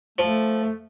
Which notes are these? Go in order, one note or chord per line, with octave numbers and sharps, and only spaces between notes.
F3 A3